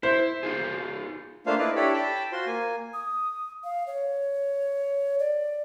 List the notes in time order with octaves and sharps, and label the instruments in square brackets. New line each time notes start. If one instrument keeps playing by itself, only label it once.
[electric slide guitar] E4 [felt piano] C5
[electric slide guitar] D#4 F4 G#4
[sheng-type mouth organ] A3 A#3 D4 F4 C5 F5
D#4 E4 B4 D5
D4 E4 G4 A4 C#5 B5
G5 A5 B5
F4 F#4 C5 C6
A#3 G#5
[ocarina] D#6
F5
C#5
D5